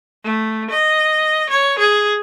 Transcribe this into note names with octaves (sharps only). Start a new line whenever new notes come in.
A3
D#5
C#5
G#4